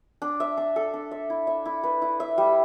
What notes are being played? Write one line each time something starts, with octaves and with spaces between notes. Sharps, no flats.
D4
E5
D4
A4
D4
E5
E4
E5
E4
B4
E4
E5
G3